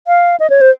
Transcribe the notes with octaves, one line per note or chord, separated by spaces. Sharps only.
F5
D#5
C#5
C5